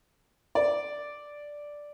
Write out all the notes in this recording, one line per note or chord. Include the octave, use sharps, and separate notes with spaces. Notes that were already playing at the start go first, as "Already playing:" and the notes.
D5